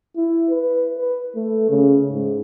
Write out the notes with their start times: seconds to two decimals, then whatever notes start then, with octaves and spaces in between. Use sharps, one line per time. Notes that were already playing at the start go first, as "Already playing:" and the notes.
0.16 E4
0.50 B4
0.97 B4
1.36 A3
1.69 C#3
2.10 G#2